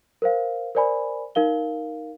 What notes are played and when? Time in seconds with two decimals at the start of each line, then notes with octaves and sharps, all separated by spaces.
0.22 A#4 C5 F5
0.75 A#4 C5 D5 G#5 B5
1.35 D#4 A#4 F5 G7